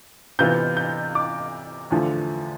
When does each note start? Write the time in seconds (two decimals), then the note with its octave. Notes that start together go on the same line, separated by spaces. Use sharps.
0.39 C3 E3 B3 F4 G6
0.77 G6
1.15 D6
1.90 E2 D3 F3 A3